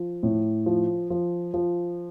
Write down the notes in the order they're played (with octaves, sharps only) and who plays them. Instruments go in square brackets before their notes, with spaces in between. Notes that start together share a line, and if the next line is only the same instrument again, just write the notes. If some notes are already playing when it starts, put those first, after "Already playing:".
Already playing: [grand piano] F3
A2
F3
F3
F3